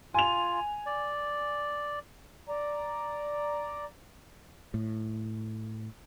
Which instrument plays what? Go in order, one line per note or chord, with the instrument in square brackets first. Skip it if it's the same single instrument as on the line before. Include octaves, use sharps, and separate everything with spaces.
[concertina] F4 [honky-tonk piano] G#5 F7
[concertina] D5
[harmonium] D5 A#5
[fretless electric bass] A2